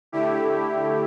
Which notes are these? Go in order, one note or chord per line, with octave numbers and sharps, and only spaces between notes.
D3 A3 E4 G4